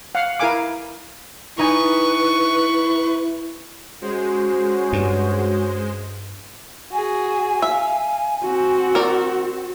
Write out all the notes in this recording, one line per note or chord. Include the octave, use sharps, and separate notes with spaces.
F5 F#5
E4 A#4 F5 G#5 D6
D#4 E4 B4 G#5 C#6
G#3 C#4 F#4 C5
G2
F#4 G#4 G#5
E5 F5
C4 F#4
A#4 D5